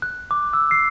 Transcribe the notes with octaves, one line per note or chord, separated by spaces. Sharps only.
F#6
D6
E6
C7